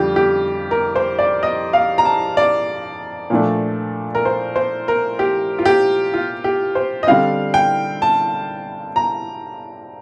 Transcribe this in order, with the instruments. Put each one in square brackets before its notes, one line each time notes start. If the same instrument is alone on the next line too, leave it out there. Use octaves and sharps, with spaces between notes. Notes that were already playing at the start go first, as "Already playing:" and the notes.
Already playing: [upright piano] F2 D3 G3 F4 G4
G4
A#4
C5
D5
D#5
F5
A#5
A5
D5
A#2 F3 A3 D4
A#4
C5
C5
A#4
G4
F4
G4
F4
G4
C5
D#5
D3 G3 C4 F5
G5
A5
A#5